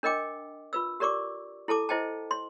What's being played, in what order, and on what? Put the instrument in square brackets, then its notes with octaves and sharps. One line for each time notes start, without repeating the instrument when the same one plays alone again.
[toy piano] D4 A#4 D#5 G5 D6
F4 B4 E6
G4 A#4 D5 C#6 D6
E4 A4 A5 D6
E4 C5 D#5 G5 A5
C6